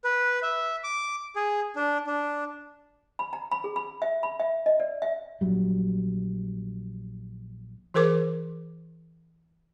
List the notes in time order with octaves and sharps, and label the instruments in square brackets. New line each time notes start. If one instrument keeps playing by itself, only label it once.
[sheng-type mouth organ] B4
E5
D6
G#4
D4
D4
[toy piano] B5
A#5
B5
G#4
B5
E5
B5
E5
D#5
D5
E5
[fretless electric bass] A#1 F#3 G3
[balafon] E3 G#4 A#4 C5 D6